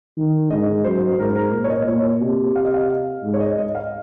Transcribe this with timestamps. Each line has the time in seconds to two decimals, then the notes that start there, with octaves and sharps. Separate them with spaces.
0.17 D#3
0.51 G#2 D#5
0.84 F#2 C5
1.12 C5
1.19 G#2 A#4
1.36 A#4
1.53 A#2
1.64 C#5
1.70 D#5
1.87 A#2 C#5
2.22 C3
2.56 F5
2.65 D#5
2.74 F5
3.23 G#2
3.34 C#5
3.40 D#5
3.58 D#5
3.75 F5